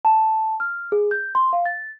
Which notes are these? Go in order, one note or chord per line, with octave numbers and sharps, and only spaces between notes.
A5
F6
G#4
G6
C6
F5
A6